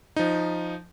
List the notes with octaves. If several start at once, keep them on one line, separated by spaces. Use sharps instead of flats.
F3 D#4